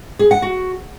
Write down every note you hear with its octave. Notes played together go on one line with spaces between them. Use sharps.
G#4
F#5
F#4